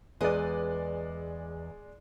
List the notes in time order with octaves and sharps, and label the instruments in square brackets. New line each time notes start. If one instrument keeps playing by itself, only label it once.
[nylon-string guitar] E2 B4 D#5 [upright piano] G#3 D5